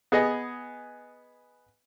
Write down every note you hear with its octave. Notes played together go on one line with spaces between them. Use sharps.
B3 G#4 D#5